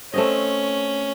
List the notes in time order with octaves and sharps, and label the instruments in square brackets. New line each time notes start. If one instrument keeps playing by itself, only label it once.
[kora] A3 C4 D#5 [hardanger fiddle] C#4